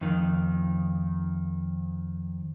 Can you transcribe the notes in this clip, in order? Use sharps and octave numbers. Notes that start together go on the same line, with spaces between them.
F2 D#3